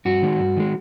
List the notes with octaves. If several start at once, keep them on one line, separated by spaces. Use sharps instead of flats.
G2 F#4
D#3 G#3
G2
D#3 G#3